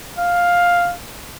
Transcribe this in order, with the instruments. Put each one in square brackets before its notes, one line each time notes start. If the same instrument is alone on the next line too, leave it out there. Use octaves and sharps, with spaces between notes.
[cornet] F5